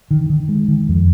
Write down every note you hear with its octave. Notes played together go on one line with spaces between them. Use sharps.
D#3
D#3
G#3
D#3
F2